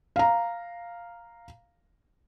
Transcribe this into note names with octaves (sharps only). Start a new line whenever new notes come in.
F5 A#5